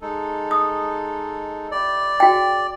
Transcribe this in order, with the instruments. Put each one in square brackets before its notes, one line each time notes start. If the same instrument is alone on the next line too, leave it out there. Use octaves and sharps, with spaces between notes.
[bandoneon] G#3 D#4 A4
[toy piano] D#6
[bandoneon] F2 E4 G4 [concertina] D5
[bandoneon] C#3 [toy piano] F#4 G5